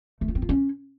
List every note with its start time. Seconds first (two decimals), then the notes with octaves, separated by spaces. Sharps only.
0.21 A3
0.28 F4
0.35 C4
0.42 F4
0.49 C#4